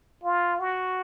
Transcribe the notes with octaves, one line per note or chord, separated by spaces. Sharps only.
F4
F#4